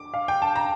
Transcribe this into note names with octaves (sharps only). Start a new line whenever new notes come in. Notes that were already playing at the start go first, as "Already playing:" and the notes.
Already playing: D6
F5
G5
A5
A#5